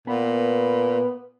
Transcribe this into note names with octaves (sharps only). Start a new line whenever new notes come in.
A#2 B3